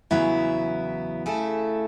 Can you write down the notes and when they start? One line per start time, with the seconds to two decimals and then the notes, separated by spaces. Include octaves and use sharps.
0.11 E2 C#3 F#3 B3 E4
1.26 C#3 A3 E4 A4